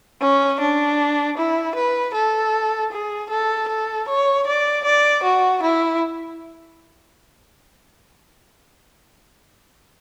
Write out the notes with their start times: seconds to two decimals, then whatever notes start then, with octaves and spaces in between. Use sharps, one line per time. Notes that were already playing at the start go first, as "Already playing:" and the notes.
0.21 C#4
0.60 D4
1.37 E4
1.75 B4
2.14 A4
2.92 G#4
3.30 A4
3.68 A4
4.08 C#5
4.47 D5
4.84 D5
5.23 F#4
5.63 E4